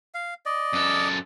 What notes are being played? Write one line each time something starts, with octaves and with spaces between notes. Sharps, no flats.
F5
D5 D#5
F#2 A4